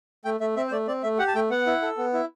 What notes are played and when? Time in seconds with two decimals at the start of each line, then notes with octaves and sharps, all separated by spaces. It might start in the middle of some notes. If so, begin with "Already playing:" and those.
0.25 A3 G5
0.40 A3 E5
0.56 C4 E5
0.68 C5
0.72 A3 D5
0.87 C4 D5
1.03 A3 E5
1.19 G4 F#5
1.28 A5
1.35 A3 G5
1.50 B3 F#5
1.67 E4
1.82 A4
1.97 B3
2.13 E4